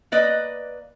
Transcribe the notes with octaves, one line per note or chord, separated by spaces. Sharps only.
A#3 B4 D5 D#5